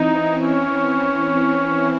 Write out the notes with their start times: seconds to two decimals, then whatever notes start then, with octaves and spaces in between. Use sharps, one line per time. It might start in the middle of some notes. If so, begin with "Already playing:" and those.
Already playing: E3 C4 D#4 E4
0.33 C#4